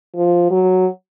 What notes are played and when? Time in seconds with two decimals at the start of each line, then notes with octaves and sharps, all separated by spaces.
0.16 F3
0.51 F#3